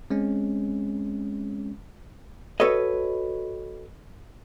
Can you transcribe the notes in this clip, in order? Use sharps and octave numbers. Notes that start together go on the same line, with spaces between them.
G#3 C4 C#4
F#4 A4 B4 C#5 D#5